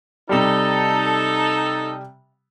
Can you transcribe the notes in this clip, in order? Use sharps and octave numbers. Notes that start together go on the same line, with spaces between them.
C3 G3 D#4 A4